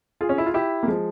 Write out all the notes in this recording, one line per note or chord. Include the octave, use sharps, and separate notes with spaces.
F4 G#4
C#4
E4
F4
E4 G4
A#3
F3 G#3